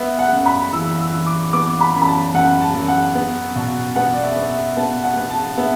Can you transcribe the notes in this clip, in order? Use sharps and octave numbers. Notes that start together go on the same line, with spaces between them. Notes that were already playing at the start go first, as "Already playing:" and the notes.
Already playing: B3 E5
F#5
F#2
B5
E3 E6
E6
E3
D6
B3 D6
B5
F#2
B5
A5
F#2 F#5
A5
F#2
F#5
B3
B2
B3 F#5
D5
E5
B3
E5
B3 A5
F#5
B3
A5
B3 E5